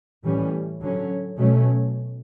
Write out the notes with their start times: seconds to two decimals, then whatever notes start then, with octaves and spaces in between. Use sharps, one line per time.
0.23 A2 E3 G3 C#4
0.81 D3 F#3 C#4
1.38 B2 F#3 A3 C#4